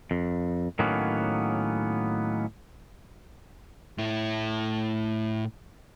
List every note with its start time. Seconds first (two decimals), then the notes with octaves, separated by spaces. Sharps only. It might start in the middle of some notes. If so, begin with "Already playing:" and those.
0.11 F2
0.79 A2 D#3 F#3 A#3 B3 C#4
3.98 A2 E4